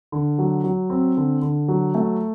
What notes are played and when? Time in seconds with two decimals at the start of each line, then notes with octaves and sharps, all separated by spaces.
0.12 D3
0.39 F#3
0.64 F#3
0.90 C4
1.17 D3
1.42 D3
1.68 F#3
1.95 A3